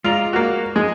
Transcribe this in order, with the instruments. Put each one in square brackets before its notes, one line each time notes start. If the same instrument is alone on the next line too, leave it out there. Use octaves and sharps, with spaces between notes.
[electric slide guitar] G#3 D5 A#5 [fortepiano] F4
[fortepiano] A#3 F#4
[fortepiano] G#3 [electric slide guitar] G#5